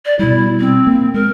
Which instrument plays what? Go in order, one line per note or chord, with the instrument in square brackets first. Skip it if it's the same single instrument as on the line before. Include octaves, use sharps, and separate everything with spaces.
[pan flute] D5
[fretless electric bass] B2 G3 [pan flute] E4
[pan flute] C4
[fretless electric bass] A#3
[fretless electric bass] G#3 [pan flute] A#4